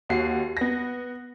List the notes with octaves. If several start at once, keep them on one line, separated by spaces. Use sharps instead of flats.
D#2 F#4 C7
B3 A#6